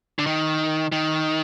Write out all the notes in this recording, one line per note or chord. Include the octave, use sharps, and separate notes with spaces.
D3
D#3
D#3